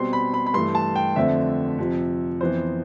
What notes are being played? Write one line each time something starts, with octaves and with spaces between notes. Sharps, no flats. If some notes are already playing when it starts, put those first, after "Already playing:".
Already playing: B2 G3 C4 C6
B5
B5
B5
G2 E3 A3 C6
A5
G5
F2 D3 A3 C4 E5
F2 C3 F3
F2 E3 B3 C5